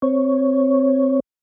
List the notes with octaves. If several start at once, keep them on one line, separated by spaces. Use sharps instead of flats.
C4 C#5